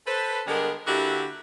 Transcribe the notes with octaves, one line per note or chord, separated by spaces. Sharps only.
A4 B4 C5
D3 G3 G#3 B3 G#4 A#4
D3 A#3 E4 F#4 G4